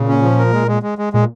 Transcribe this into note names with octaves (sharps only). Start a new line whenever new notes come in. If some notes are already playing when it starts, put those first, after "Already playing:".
Already playing: A#2 C#3
C#4
F3
A#4
G#3
G#3
G#3
G#3
A#2 G#3